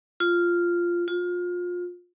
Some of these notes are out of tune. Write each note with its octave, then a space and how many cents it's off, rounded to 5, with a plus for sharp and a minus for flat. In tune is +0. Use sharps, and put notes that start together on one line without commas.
F4 -5
F4 +25